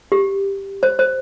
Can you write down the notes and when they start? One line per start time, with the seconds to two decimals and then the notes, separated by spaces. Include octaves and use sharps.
0.12 G4
0.83 C5
0.99 C5